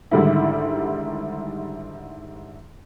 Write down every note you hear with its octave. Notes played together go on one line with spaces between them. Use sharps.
G#2 D3 D#3 G3 A3 E4